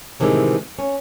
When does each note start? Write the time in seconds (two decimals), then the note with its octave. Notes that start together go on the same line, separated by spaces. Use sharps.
0.20 A2 C3 D#3 E3 G#3
0.79 C#4